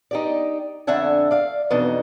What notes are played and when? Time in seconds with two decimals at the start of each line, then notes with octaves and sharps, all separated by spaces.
0.11 D#4 G4 D5
0.87 F2 D3 D4 E5 F#5 G#5
1.31 D5 F5
1.70 F2 B2 E3 D4 D#4